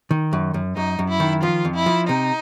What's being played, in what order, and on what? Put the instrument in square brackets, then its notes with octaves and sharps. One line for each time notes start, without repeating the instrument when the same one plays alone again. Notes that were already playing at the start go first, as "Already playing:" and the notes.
[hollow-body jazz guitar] D#3
F#2
F#2
[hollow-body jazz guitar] F#2 [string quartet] D#4
[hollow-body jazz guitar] F#2
[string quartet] E4
[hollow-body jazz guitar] D#3
[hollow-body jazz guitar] F3 [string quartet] F4
[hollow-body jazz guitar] F2
[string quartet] E4
[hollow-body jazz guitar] F3
[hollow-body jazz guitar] C3 [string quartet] D#4